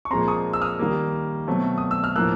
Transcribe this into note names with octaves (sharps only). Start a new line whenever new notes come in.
C#6
A#2 F3 G#3 C4 A#5 C6
C#6 D#6
E6
D#6 F6
D#3 G3 A#3
B2 F#3 A3 C4
D#6
E6
F6
A2 F3 A#3 E6 F#6